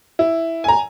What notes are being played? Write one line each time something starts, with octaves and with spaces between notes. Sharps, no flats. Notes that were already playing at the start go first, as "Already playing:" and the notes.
E4
G#5 A#5